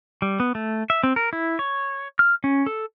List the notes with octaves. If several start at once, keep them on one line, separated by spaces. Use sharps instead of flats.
G3
B3
A3
E5
C4
A#4
E4
C#5
F6
C#4
A4